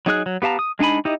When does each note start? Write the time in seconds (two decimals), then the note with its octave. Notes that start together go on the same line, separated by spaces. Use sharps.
0.06 F#3 D#4 G#4 F#6
0.26 F#3
0.42 B3 G4 F5 A5 A#5
0.59 D#6
0.79 G#3 D4 D#4 G#5 B5
1.05 D#4 E4 G4 D#5